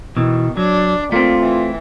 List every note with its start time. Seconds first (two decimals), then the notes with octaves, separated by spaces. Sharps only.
0.17 B2 D#3 E3
0.57 F#3 D4
1.12 A3 A#3 C4 F4
1.41 E3